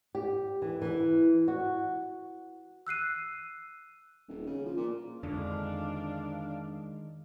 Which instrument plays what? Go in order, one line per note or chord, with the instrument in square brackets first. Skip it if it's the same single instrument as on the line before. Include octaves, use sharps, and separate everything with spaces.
[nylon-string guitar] G4
E3
E3
F#4
[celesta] E6 F#6 C7 D#7
[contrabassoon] D#1
C#3
F3
A#2
[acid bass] F2 [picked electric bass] D3 [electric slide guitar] D#3 G#3 [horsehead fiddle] D4 F5